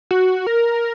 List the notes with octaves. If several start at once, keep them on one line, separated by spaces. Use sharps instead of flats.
F#4
A#4